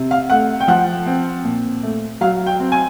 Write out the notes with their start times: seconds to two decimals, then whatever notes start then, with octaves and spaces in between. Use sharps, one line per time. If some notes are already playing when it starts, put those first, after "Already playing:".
Already playing: C3
0.11 F5
0.30 A3 F#5
0.60 G5
0.68 F3 F#5
1.06 C4
1.44 A#2
1.83 A3
2.21 F#3 F5
2.46 G5
2.60 C4
2.72 G#5